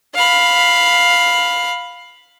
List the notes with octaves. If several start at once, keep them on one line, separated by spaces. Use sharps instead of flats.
F5 B5